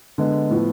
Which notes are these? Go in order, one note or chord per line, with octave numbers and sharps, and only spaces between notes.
D3 G#3 B3
A2 F3 B3